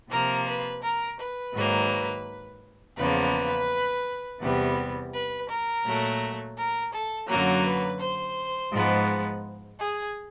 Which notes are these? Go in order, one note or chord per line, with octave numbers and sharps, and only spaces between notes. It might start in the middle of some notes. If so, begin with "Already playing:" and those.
C3 F3 A#3 A#4
B4
A#4
B4
G#2 D#3 F#3 A#3
E2 C#3 F3 A#3 B4
E2 C3 E3 G3 B3
B4
A#4
A#2 F#3 A3
A#4
A4
F#2 D3 F#3 A#3 A#4
B4
C5
G#2 F3 G#3 B3
G#4